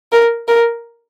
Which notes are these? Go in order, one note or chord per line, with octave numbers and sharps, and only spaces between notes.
A#4
A#4